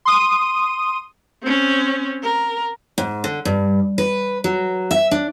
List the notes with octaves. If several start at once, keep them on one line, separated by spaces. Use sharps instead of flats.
C6 D#6 D#7
C4 C#4
A#4
G#2
D3
G2
B4
F#3
E5
D4